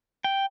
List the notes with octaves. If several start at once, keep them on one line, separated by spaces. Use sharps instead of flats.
G5